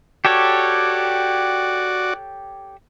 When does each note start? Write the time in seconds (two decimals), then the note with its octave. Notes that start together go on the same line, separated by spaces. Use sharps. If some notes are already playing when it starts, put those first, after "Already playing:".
0.25 F#4 G4 A4 C#5 D5